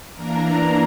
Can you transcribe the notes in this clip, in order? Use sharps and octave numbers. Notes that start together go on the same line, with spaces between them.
E3 A#3 D4 A#4 A#5